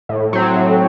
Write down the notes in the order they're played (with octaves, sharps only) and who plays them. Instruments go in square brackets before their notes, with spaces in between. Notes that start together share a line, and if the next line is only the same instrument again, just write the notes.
[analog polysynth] A2
F#3 C4
A2